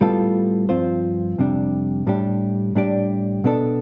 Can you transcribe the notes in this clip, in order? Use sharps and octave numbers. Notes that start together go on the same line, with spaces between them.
A2 G3 B3 F4 A4
G2 F3 C4 F4 C5
F2 C3 G3 D4
A2 G3 D4 G4
A2 G3 D4 G4 D5
B2 B3 D4 A4